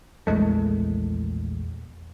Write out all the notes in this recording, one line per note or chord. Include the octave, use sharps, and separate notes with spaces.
A#1 E2 G#3 A3